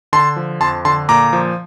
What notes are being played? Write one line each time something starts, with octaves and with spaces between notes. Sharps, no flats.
D3 A5 C6
F3
F2 A5 C6
D3 A5 C6
A#2 A#5 D6
F3